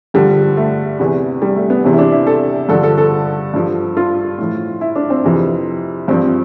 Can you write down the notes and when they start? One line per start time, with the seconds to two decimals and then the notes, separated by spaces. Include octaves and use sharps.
0.14 G2 D3 F3 G3
0.57 A3
0.99 E2 C3 E3
1.42 G3
1.56 A3
1.70 B3
1.84 E2 C3 E3 C4
1.93 E4
1.98 D4
2.12 E4
2.27 A4
2.69 G2 D3 F3 A4
2.83 A4
2.98 A4
3.54 G2 F3
3.97 F4
4.38 A2 F3
4.81 E4
4.95 D4
5.10 C4
5.24 F2 C3 E3
6.08 G2 F3 C4